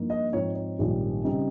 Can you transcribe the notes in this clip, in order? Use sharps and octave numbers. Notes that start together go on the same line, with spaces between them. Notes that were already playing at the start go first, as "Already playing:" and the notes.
Already playing: G2 F3 A#3 D#4
D#5
G#2 F3 C4 D#4 C#5
C#5
A#1 G#2 D#3 G3 C4
C#3 G3 C4 D#4